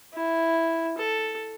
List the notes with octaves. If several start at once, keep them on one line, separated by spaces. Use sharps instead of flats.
E4
A4